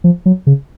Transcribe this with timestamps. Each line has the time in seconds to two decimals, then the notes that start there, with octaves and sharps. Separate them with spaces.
0.04 F3
0.26 F#3
0.47 C#3